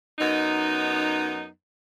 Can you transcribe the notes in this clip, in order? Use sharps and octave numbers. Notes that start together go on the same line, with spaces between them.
F#2 B3 D#4